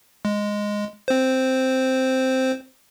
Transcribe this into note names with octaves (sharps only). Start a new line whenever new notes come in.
G#3
C4 C5